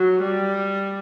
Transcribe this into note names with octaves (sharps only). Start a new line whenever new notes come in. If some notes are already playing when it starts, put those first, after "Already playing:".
Already playing: F#3
G3